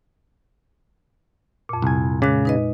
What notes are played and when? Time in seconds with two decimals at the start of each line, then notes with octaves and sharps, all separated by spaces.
1.69 F2 A#2
1.82 C2 G#5
2.22 A#2 C#3 G#3 F#6
2.45 D#4 B4 D#5